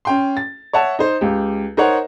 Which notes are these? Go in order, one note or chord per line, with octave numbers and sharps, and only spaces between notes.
C#4 G5 C6
A6
C#5 E5 F#5 A5
D#4 C5
C#2 G4
D#4 A#4 C5 C#5 F#5